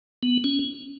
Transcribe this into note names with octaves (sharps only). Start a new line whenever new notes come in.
B3
C#4